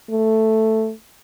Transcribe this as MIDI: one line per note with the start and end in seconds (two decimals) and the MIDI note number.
0.10 0.92 57